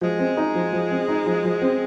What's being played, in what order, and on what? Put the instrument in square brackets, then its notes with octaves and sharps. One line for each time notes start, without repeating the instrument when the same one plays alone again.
[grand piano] F3 [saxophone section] G#3
[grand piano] C4
D#4
F3
F3
C4
D#4
F3
F3
C4